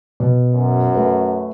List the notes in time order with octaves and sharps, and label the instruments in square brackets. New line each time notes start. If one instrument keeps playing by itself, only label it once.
[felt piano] B2
[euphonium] F#2
[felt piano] A3 B4